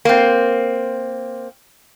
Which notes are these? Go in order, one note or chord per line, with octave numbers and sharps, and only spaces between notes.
A#3 C4